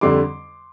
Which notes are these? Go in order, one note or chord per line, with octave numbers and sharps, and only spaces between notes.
F2 D3 G3 C6 D6